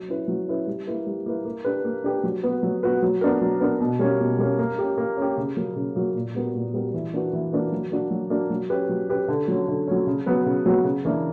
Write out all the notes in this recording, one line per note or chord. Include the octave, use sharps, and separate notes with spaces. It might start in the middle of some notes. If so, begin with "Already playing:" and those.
Already playing: F#3
C#4 E4 B4
F#3
C#4 E4 B4
G3
A#3 E4 B4
G3
A#3 E4 B4
A#3
D4 G4 B4
A#3
D4 G4 B4
F#3
B3 F#4 B4
F#3
B3 F#4 B4
F#3
B3 D4 A#4
F#3
B3 D4 A#4
B2
G3 A#3 C#4
B2
G3 A#3 C#4
A#3
C#4 G4
A#3
C#4 G4
C#3
F#3 A#3
C#3
F#3 A#3
A#2
G3 B3 F#4 A#4
A#2
G3 B3 F#4 A#4
E3
A#3 D4 F#4 B4
E3
A#3 D4 F#4 B4
F#3
A#3 D4 F#4
F#3
A#3 D4 F#4
F#3
C#4 G4 B4
F#3
C#4 G4 B4
D3
F#3 C#4
D3
F#3 C#4
C#3
F#3 B3 F#4 B4
C#3
F#3 B3 F#4 B4
C#3
E3 A#3 D4